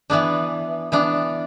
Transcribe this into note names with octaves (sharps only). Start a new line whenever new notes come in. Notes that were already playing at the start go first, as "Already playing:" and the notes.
E3 B3 D4
E3 B3 D4